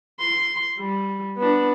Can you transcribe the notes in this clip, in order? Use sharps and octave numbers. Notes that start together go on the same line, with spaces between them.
C6
G3
B3 D4